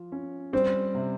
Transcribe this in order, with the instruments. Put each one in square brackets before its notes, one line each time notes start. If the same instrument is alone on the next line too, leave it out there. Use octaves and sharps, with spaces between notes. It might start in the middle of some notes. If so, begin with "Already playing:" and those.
Already playing: [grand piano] F3 F4
C#4
[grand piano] G3 [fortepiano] C4
[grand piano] C3